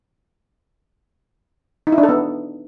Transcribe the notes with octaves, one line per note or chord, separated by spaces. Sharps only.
D#4
E4
D4
A4
B3